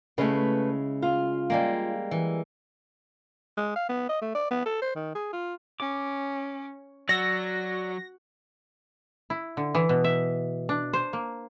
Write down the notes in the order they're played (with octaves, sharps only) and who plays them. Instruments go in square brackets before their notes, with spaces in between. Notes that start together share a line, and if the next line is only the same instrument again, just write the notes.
[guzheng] C#3 G#3 E4 [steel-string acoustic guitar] A3 B4
[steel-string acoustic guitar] F4 F5
[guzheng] G3 G#3 A#3
E3
[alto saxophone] G#3
F5
B3
D#5
A3
D5
B3
A4
C5
D#3
G#4
F4
[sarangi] C#4 [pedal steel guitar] D6
[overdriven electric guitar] F#3 [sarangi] F#4 [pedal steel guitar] D5 F#5 E6 [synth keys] A#6
[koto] E4
D3
E3
B2
E5
D4
C5
A#3